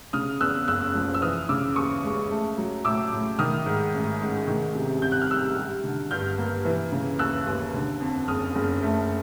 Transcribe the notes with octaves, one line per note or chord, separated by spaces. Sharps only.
C#3 D#6 F6
E2 E6 F#6
F#1 E6 F#6
F3
E6
E3 D#6 F6
C#3 D6 E6
D#2 C#6 D#6
G#3
A3
F#3
A2 D6 E6
A2
D#3 D#6 F6
G#2
A1
G#3
D#3
C3
C2 G6
F#6
F6
G3 E6 F#6
G3
D3
G2 F6 G6
A#3
E3
C#3
D#2 E6 F#6
D#2
D3
F2
F#1 D#6 F6
F#1
A3